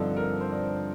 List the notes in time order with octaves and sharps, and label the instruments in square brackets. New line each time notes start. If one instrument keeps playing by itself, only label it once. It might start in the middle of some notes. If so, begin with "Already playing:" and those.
Already playing: [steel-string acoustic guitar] G2 D3 F3 C4 [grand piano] D4 D#4 A4
[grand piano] A#4
C5
D5